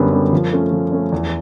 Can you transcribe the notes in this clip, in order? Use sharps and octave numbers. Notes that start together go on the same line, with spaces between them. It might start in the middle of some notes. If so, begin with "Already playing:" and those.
Already playing: F#2 D3 G3 B3
D3 G3 B3
F3
A3 C#4
F3
A3 C#4
E2